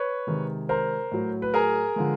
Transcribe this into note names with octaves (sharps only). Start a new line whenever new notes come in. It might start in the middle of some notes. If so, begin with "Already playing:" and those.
Already playing: B4 C#5
C3 D#3 G#3
A#4 C5
A2 F#3
B4
G#4 A#4
D3 F3 G#3